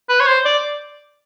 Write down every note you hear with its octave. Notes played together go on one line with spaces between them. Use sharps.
B4
C#5
C5
D5